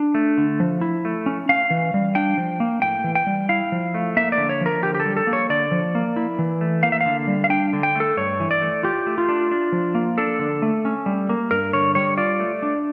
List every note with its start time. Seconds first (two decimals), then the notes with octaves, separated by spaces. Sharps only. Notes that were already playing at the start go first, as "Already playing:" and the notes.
Already playing: D4
0.15 A3
0.38 D3
0.60 F3
0.81 E4
1.05 A3
1.26 C#4
1.49 C#4 F5
1.70 E3
1.94 G3
2.15 D4 G5
2.38 F3
2.60 A#3
2.82 A2 G5
3.04 E3
3.15 G5
3.27 G3
3.49 E4 F5
3.72 F3
3.94 A3
4.17 A#3 E5
4.32 D5
4.38 D3
4.49 C#5
4.61 F3 A#4
4.82 D3 G4
4.95 G4
5.00 A4
5.06 G3
5.17 A4
5.27 A#3
5.33 C#5
5.50 D3 D5
5.72 F3
5.95 A#3
6.16 E4
6.39 E3
6.61 A3
6.83 A#3 F5
6.92 E5
7.01 D3 F5
7.28 G3
7.44 F5
7.50 D4 G5
7.73 D3
7.83 G5
7.95 A3 A4
8.17 G2 C#5
8.40 E3
8.51 D5
8.62 A3
8.83 F4 G4
9.07 A3
9.18 F4
9.29 D4
9.51 D4
9.72 F3
9.95 A#3
10.18 D4 A4
10.39 D3
10.62 A3
10.85 C#4
11.06 G3
11.29 A#3
11.51 G2 A#4
11.73 D3 C#5
11.95 G3 C#5
12.17 F4 D5
12.40 A3
12.63 D4